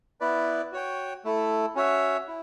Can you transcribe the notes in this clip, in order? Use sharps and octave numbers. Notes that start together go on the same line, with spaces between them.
B3 E4 B4 D5
F#4 C#5 G5
A3 E4 A4
C#4 F#4 C#5 E5
E4